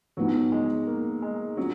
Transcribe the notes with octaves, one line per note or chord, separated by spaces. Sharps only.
G#2 F3 F#3 B3 D#4
G#3
A#3
G#3
F#3 C#4 F4